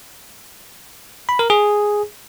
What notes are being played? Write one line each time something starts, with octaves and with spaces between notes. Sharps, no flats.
B5
A#4
G#4